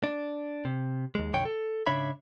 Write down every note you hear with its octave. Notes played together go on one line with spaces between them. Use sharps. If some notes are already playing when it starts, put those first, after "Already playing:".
D4
C3
D#2 G#3
B1 F2 D3 C#5 G5
A4
G#2 C#3 D4 C#5 E5 B5